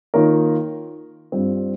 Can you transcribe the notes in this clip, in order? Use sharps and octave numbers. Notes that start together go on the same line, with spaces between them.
D#3 A#3 F4 A#4 C#5
G2 G3 C4 F4